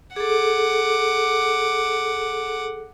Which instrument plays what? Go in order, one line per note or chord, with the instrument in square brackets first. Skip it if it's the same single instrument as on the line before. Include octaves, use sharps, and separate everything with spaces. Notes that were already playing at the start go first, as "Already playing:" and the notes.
[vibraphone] G#4 A4 [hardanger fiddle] F#5 D6